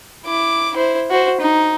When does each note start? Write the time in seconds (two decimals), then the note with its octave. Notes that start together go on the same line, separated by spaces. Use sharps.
0.25 E4 D6
0.75 E4 C5
1.10 F#4 C5
1.40 D#4